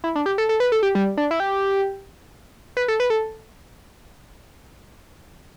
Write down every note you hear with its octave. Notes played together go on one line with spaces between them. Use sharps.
E4
D4
G4
A4
A4
B4
A4
G4
G3
D4
E4
G4
B4
A4
B4
A4